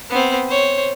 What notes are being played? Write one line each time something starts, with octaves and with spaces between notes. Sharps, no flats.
B3 C4
C5 C#5